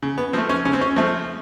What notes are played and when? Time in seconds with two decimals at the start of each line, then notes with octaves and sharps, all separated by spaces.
0.02 C#3
0.18 B3
0.33 F3 A3 C4
0.49 C#4
0.65 C#3 C#4
0.73 C4
0.81 C#4
0.96 F3 A3 C4